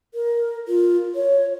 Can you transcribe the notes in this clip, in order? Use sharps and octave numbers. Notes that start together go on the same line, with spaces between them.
A#4
F4
C#5